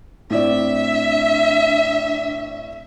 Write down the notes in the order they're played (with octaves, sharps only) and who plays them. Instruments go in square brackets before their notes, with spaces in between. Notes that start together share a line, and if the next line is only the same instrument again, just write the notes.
[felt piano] A2 C4 D5 [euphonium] D4 [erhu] E5